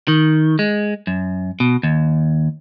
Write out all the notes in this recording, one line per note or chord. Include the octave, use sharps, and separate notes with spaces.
D#3
G#3
F#2
B2
D#2